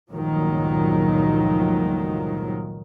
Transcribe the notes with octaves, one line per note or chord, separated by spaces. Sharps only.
G1 C#2 A#2 D#3 F3 F#3